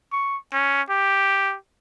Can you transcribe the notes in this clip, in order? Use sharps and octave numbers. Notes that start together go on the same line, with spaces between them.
C#6
C#4
G4